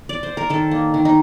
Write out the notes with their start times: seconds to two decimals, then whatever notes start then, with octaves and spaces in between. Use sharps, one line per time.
0.09 D5
0.23 C5
0.37 A#4
0.50 D#3 A4
0.71 A#3
0.94 D#3
1.05 D#4